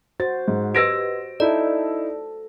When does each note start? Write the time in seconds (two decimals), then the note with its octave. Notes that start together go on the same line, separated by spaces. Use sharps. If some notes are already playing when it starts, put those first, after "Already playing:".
0.20 F#4 C5 A6
0.48 G#2
0.75 G4 B4 D#5 E6 A#6 D7
1.40 D#4 E4 A4 D5